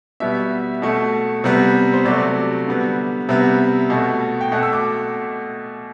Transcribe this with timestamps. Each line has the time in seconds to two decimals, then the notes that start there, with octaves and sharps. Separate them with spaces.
0.20 B2 G3 B3 E5
0.82 B2 A3
1.44 C3 G3 B3
1.94 C5
2.05 C3 F#3 A3 D5
2.67 D3 G3 B3
3.29 C3 G3 B3 E5
3.90 B2 A3
4.41 G5
4.52 B2 A3 F#5
4.63 E6
4.73 D6